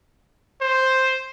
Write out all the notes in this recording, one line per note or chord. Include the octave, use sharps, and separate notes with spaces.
C5